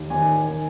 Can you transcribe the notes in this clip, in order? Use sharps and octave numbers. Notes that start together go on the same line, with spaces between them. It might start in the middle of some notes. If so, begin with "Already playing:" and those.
Already playing: D#2 D#3
D#2 D#3 G#5
D#3